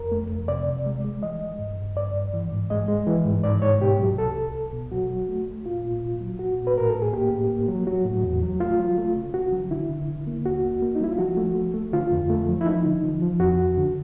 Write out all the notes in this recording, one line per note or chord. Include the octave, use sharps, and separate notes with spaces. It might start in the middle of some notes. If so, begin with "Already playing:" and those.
Already playing: F2 A#4
A3
F2
C3 D5
C3
G#3
G#3
E3 D#5
G#3
G2
G2
G2 D5
G2
E3
G#2
G#3 D#5
G#3
E3
G#2
G#2 D5
G#2 C#5
B2 G4
F#3
C2 A4
C2
C2
B2
F#3 F#4
F#3
A3
A3
A#2 F4
A#2
A#2
F#3
A#2 F#4
A#2
B4
A2 A#4
A4
A2
G#4
A#3 G4
A2
A#3
F#3
F#3 F#4
A2
E2
F#3
A3 F4
F#3
A3
C#3
C#3 F#4
F#3
D3 E4
D3
D3
A#3
D#2 F#4
A#3
A#3
D#4
G3 E4
F4
F3 F#4
A3
A3
A3
D3 F4
F2
A3
F3
E4
F3 D#4
D3
F3
F3
F2 F#4
F2
D3